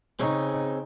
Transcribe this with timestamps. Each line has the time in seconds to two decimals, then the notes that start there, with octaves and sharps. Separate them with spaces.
0.19 C#3 C4 D#4 G#4 C#5